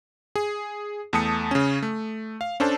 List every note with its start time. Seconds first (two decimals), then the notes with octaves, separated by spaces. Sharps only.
0.36 G#4
1.13 E2 A3 A5 D#6 C#7
1.51 C#3 C#4
1.83 A3
2.41 F5
2.60 C#4 D4 A4 C5 A5